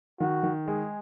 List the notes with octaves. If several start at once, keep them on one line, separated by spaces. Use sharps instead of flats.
D#3 F#4
D#3
G#3 G#4